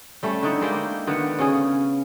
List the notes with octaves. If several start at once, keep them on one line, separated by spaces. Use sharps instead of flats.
G3 A3 C#4
D3 D#4 E4
G#3 A#3 G4
D3 D#3 B3
C#3 C#4 G#4